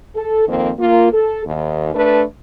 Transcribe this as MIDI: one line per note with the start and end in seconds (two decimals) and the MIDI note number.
0.15 0.47 69
0.47 0.70 41
0.47 0.70 51
0.47 0.70 58
0.47 0.70 60
0.77 1.11 58
0.77 1.11 65
1.11 1.46 69
1.46 1.91 39
1.94 2.23 57
1.94 2.23 62
1.94 2.23 69
1.94 2.23 71